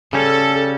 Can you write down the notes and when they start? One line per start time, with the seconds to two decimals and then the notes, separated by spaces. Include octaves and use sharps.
0.13 C#3 G3 C#4 A4